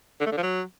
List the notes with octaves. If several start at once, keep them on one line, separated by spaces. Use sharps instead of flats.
D3
A3
D3
F3
F#3